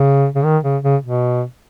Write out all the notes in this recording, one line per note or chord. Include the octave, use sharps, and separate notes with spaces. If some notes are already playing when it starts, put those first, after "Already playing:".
Already playing: C#3
C#3
D#3
C#3
C#3
B2